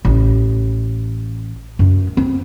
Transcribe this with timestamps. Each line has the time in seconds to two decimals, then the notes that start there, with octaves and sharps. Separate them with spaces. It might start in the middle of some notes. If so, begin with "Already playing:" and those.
0.05 A1
1.79 F#2
2.17 C4